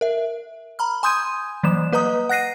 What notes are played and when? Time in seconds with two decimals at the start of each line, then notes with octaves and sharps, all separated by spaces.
0.01 A#4 E5
0.79 A#5 B5 F6
1.03 G#5 C6 D#6 G6 G#6 D#7
1.63 E3 F#3 G3 A#3 E7
1.93 A#3 B4 D#5 A#5 D#6
2.29 F#5 F#6 A#6 C7 D#7